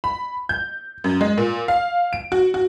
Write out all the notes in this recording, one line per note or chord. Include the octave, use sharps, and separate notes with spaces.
B5
G6
F#2
G#3
A#2
F5
D7
F#4
F#4